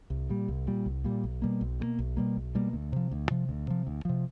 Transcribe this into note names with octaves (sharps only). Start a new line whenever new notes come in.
C2
A#2 G3
C2
A#2 G3
C2
A#2 G3
B1
B2 G3 A#3
B1
B2 G3 A#3
B1
B2 G3 A#3
B1
B2 G3 A#3
D2
C3 F3
D2
C3 F3
D2
C3 F3
D2
C3 F3